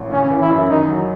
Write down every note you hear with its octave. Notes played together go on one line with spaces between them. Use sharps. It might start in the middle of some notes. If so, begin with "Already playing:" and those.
Already playing: A1
C#3 C#4
E3
E4
F#2
D#3 D#4
F#3